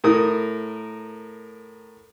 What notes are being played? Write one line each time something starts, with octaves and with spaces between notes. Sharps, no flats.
A2 A#4 D#6